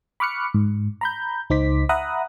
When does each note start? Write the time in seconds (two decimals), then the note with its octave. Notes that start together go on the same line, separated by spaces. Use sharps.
0.20 B5 C#6 D6 F6 F#6 C#7
0.54 G#2
1.01 A#5 B5 G6
1.50 C#2 D#4 C5 D6 B6
1.89 E5 F#5 A#5 B5 D#6 F#6